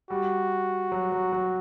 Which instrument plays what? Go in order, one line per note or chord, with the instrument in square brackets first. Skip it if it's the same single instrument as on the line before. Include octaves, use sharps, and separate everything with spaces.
[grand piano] G3 [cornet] F#4
[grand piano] F#3
F#3
F#3